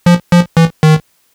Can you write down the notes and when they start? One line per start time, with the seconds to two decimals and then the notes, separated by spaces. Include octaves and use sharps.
0.06 F3
0.32 F3
0.57 E3
0.83 D#3